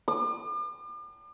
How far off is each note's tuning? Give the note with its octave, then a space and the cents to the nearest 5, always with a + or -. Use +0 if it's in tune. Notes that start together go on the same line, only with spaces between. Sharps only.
D6 +45